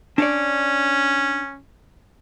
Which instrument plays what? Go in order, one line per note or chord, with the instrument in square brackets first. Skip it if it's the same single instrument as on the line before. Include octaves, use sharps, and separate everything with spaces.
[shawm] C#4 [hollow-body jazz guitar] D4 C#5 D5